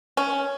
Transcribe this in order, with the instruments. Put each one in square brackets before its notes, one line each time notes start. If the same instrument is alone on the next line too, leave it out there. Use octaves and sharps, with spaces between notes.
[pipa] C#4